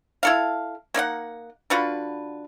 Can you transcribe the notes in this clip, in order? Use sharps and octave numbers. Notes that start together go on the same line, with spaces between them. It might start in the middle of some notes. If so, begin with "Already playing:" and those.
E4 A4 F5
A#3 D#4 D5 F#5
D3 F4 F#4 B4